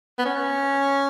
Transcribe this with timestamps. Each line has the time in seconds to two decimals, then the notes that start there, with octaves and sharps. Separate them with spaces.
0.18 B3
0.25 C#4